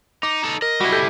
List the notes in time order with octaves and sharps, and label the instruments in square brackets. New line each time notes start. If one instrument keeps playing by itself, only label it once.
[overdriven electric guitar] D#4 [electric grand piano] D6
[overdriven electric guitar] D#4 A4
[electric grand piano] A#4 [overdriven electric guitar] D#5
[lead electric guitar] G3 E4 [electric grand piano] F#4
[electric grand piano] G4 A4 G6